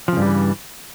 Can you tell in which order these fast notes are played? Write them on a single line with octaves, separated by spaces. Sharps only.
F3 C#3 G2 G3 E3